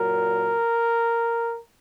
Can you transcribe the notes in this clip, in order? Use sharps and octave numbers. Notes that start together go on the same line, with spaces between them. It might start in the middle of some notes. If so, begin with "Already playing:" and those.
Already playing: A#2 F#3 A#4